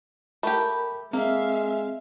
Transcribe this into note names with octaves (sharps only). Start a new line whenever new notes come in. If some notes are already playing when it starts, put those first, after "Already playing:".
A3 G4 A#4 B5
G#3 A#3 C4 E5 F5